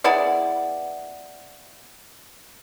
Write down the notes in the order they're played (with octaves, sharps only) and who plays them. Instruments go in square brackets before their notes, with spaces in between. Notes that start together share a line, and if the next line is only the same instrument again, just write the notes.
[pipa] B3 E4 G#4 D5